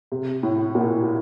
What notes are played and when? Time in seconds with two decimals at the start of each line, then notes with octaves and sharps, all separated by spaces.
0.12 C3
0.43 A2
0.75 A#2